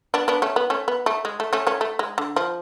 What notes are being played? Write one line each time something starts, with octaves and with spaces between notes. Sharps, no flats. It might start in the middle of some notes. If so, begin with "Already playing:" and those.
B3 D4
B3 D4
A3 C#4
B3
A3 C#4
B3
A3
G#3
A3
A3 C#4
A3 C#4
A3
G#3
D3
F3